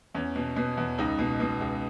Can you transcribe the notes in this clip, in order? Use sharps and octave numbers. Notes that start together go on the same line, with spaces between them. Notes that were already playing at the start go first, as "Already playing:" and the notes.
E2 C#4
B2
B2
E2
C#2 D#4
B2
B2
C#2